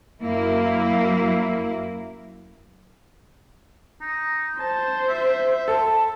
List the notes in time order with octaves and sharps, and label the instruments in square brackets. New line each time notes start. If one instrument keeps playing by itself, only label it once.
[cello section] F#2 A#3 E4
[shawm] D#4
[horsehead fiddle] C5 [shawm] A5
[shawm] E5
[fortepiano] A4 [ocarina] A5